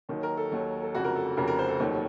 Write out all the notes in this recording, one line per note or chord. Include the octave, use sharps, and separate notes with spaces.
D#2 D#3 F#3
A#4
A4
D#2 D#3 F#3
A4
F1 F2 C#3 F#4
A#4
A4
F1 F2 C#3 A#4
A#4
C5
A4
F1 D#2 D#3 F#3